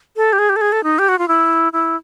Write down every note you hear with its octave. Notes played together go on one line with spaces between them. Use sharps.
A4
G4
G#4
G4
A4
G#4
A4
D#4
G4
F#4
F4
E4
E4